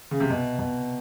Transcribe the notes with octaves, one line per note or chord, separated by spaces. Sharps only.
C#3
C3
B2
B2